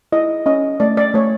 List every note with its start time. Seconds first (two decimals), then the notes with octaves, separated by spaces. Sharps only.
0.12 E4 D#5
0.46 C#4 D#5
0.80 A3 D5
0.97 D5
1.14 A3 C#5